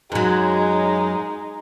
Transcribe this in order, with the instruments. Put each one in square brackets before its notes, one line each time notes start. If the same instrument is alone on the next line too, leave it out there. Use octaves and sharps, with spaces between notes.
[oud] F#2 F#3 [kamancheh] G#3 D#4